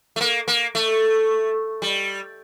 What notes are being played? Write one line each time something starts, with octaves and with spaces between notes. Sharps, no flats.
A3
A#3
A#3
A3
G3